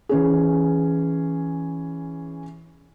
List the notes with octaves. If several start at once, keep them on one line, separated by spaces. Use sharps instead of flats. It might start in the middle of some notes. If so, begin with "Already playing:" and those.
E3 C#4 G#4